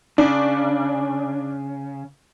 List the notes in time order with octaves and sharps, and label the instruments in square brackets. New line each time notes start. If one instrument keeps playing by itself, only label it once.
[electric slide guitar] C#3 [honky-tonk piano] D4